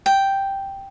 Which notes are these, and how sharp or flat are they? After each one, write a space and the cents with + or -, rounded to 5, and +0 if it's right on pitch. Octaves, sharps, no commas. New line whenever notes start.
G5 +0